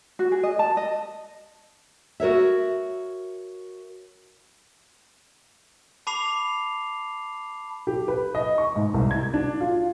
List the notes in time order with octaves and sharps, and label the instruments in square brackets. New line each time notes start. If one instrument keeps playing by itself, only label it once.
[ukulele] F#4
G#4
D#5
A5
D#5
[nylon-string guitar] F#4 A#4 C#5 E5
[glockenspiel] A5 B5 D6 C7 F7
[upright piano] G4
B4
D#5
C#6
G#2
C2
G#6
D4
F4